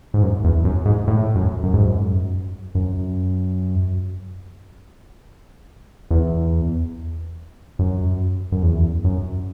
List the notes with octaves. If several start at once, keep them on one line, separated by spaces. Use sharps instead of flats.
G#2
F#2
E2
F#2
G#2
A2
F#2
F#2
G#2
F#2
F#2
E2
F#2
F#2
E2
F#2